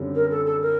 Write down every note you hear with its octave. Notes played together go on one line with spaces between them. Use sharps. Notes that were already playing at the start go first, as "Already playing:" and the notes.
Already playing: F#2 D3 G3 C4
A#4
A4
A4
A#4